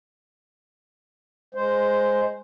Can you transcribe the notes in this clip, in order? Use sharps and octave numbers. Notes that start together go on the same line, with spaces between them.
G#3 C5